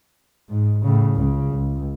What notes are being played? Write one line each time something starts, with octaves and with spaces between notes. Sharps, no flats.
G#2
A2 C#3
C#2 C#3
C#2